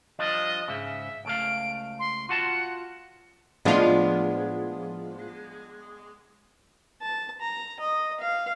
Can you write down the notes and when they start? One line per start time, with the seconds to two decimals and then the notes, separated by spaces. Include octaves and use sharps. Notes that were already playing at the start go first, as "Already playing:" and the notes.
0.19 F3 G3 D4 D#5
0.68 G#2 C#3 E5
1.25 C#2 A3 F5 D7
1.99 C6
2.29 F4 F#4 F#5 A5
3.65 A2 F3 G#3 B3 D4 F4
7.02 A5
7.41 A#5
7.80 D#5
8.20 F5